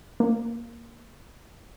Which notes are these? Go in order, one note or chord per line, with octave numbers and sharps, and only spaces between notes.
A#3